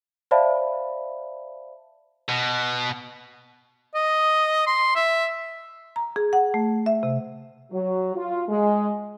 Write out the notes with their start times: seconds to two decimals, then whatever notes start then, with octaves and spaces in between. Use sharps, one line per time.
0.31 C5 D5 E5 F5 A5 B5
2.29 B2
3.95 D#5
4.67 C6
4.95 E5
5.96 A#5
6.16 G#4
6.33 F#5
6.54 A3
6.86 E5
7.03 C3
7.72 F#3
8.16 F4
8.48 G#3